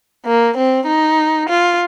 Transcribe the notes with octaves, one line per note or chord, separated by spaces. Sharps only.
A#3
C4
D#4
F4